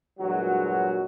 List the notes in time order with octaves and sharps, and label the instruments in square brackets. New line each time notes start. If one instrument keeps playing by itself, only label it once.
[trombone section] E2 G2 A#2 F#3 G#3 F#4